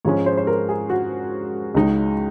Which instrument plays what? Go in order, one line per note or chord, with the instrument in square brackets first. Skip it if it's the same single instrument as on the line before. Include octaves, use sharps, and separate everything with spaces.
[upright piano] G#2 F3 G#3 C#4 C#5
C5
C5
A#4
G#4
F#4
C#2 C#3 G#3 D#4